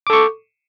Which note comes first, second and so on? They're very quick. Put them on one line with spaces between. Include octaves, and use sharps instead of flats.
D6 A4 C#6